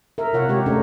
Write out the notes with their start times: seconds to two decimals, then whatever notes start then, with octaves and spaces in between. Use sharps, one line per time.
0.18 A#4 E5
0.33 C3 F4 C#5 F#5
0.49 G#3 G4 C#5
0.66 A3 C#4 D4 G4 A4 A#4